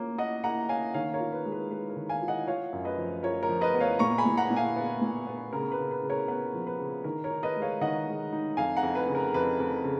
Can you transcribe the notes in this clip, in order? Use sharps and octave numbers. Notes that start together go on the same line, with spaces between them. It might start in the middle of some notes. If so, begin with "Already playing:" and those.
Already playing: A#3 C#4 F4
A#3 D#5 F#5
A#3 F#5 A#5
C#4 F5 G#5
D#3 C#5 F5
A#4 C#5
F4
B4
G#3
B4
G#3 B4
A#4
D#3
F5 G#5
F4
D#5 F#5
F4 C#5 F5
F#2
B4 D#5
F3
F4 A#4 C#5
A#4 C#5
F3
B4 D#5
B3
C#5 F5
A#2 A#5 C#6
G#5 B5
A#2
F#5 A#5
A#2
F5 G#5
B3
A#2
B3
C#3 A#4
B4
C#3
B4
C#3
A#4 C#5
B3 B4
F3
B4
C#3
D#3 A#4
A#4 C#5
D#4
B4 D#5
G#3
C#5 F5
D#3 D#5 F#5
G#3
D#4
F2 F5 G#5
F#5 A#5
F2
B4
C#3
A#4
F2 B4
F2
C#3